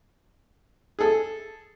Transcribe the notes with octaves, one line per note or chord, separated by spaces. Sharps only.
G#4 A4